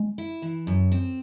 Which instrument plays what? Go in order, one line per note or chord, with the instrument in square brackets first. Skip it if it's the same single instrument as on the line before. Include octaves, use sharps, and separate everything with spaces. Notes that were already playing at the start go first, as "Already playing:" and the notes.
Already playing: [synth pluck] G#3
[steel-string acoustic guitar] E4
E3
F#2
C4